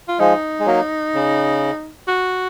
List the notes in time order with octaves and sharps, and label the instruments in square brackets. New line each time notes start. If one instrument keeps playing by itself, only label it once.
[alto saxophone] F4
[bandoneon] F3 G#3 [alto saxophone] D#4
[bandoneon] G#3
F#3 A#3
C#3
[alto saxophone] F#4